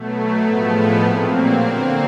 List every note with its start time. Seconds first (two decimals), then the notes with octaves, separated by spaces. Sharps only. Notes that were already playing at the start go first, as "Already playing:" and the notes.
Already playing: B2 F#3 A3
0.46 A2 F3 G#3 A3 B3
1.04 A#2 F#3 A#3 C4
1.62 D3 F#3